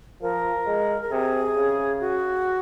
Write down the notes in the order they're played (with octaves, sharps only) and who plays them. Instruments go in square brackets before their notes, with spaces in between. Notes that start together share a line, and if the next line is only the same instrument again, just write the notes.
[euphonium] F3 [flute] A#4
[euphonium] G#3
[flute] A#4
[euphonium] C3 [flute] G#4
[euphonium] C#3
[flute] F#4